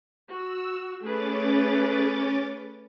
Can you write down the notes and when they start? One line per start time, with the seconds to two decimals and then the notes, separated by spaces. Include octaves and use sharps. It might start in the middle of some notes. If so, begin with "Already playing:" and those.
0.29 F#4 E6
1.02 A3 C#4 G#4 B4 D6 A6